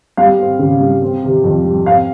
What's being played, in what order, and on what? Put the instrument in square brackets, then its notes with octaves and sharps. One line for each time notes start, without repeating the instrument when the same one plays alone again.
[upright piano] G3 F5
C4
C#3
G3
C4
C3
F2
G3
C4 F5